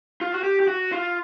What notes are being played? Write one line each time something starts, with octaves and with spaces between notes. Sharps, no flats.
F4
F#4
G4
G4
F#4
F4